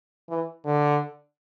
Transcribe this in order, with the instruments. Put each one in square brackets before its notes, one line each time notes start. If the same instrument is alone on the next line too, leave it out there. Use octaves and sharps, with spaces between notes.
[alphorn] E3
D3